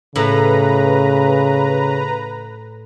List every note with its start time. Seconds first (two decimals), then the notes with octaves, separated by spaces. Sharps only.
0.16 A2 C#3 B4 A#5